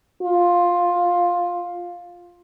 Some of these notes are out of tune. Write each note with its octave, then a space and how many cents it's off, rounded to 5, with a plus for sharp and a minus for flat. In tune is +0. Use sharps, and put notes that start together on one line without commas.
F4 +10